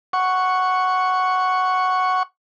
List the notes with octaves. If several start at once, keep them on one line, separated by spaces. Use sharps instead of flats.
F#5 C#6